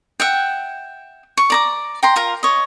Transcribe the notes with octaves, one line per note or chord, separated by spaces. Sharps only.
E5 F#5 G5
C#6
D5 A#5 D6
G5 A#5 C6
F4 A#4 A#5
C#5 D#5